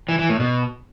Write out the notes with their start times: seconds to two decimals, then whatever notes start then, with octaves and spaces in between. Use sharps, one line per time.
0.09 E3
0.19 E3
0.29 A2
0.40 B2